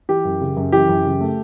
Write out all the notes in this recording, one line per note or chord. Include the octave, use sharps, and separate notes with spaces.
E3 G4
F#2
C#3
F#2
E3 G4
F#2
C#3
A3